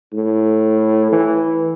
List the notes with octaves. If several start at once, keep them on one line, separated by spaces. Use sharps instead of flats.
A2
E3